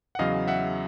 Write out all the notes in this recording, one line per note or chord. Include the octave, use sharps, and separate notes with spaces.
F#5
E2 C#3 F#3 D#5 F5
E5 F#5